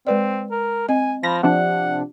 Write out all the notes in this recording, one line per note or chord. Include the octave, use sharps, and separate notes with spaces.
G#3 C4 B4 D5
A#4
C4 D#5 G#5
F3 B5 A#6
C3 F3 D4 F#5